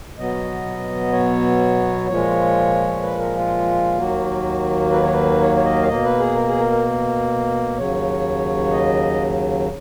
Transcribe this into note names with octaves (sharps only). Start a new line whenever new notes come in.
B2 F#3 B3 D#5
C#5
A#2 F3 G#3 C#5
B4
A#4
F4
D#2 D#3 F#3 A#3 F#4
B4
C#5
B4
C#5
C#5
D#5
F5
B2 A#3 D#5
B4
G#4
A#4
G#4
A#4
A#4
D#2 C#3 F#3 C#5
D#5